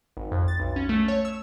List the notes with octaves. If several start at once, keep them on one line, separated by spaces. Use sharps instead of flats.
G#1
F2
A6
B1
C#4
A3
C#5
E6